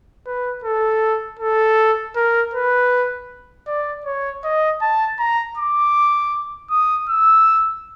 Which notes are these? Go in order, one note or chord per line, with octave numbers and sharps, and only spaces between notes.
B4
A4
A4
A#4
B4
D5
C#5
D#5
A5
A#5
D6
D#6
E6